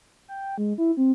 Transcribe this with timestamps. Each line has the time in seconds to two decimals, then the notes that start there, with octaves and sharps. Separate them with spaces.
0.28 G5
0.58 G#3
0.78 E4
0.97 C4